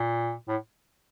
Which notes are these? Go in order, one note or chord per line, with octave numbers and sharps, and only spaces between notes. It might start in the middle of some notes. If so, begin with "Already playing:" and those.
Already playing: A#2
A2